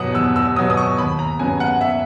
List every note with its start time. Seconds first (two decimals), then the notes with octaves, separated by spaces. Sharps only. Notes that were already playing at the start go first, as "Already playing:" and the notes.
Already playing: E2 B2 F#3 B3 F#5 D#6
0.15 E2 E6
0.36 E6
0.56 B2 F#3 B3 D#6
0.70 D#6
0.77 C#6
0.98 D#2 B5
1.19 A#5
1.39 C#3 F#3 B3 G#5
1.60 F#5
1.81 E5